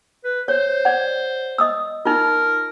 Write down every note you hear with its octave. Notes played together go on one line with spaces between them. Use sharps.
B4
C5 C#5
D5 F#5
D#5 D#6 E6
D#4 F4 A#4